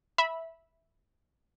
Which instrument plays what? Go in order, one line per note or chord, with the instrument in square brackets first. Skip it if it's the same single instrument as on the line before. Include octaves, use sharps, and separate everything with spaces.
[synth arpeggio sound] E5 B5